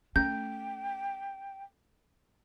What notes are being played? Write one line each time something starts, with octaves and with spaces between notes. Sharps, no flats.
A3 C#4 G5 G6